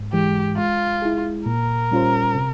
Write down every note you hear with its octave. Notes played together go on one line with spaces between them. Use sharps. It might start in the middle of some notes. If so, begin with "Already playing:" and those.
Already playing: G#2
E3 G#3 G4
G#3 F4
E4 G#4
A#2 A#4
G3 C#4 F4 C5
C3